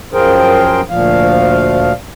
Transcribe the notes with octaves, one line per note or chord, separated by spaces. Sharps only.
F#2 F3 G#4 A#4 C5 G5
D2 A#2 F3 F5